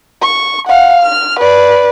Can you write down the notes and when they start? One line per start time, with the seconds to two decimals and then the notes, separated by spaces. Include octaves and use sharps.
0.22 C#6
0.68 F5 F#5
1.02 F6
1.40 B4 D5